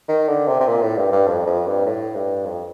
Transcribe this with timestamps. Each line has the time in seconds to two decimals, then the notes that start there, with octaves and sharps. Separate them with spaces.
0.09 D#3
0.28 D3
0.48 C3
0.60 C3
0.68 A#2
0.82 A2
0.98 G2
1.12 G2
1.27 F2
1.47 F2
1.66 G2
1.86 A2
2.15 G2
2.45 F2